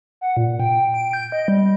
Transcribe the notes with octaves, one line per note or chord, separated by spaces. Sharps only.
F#5
A#2
G5
D7
G6
D#5
G3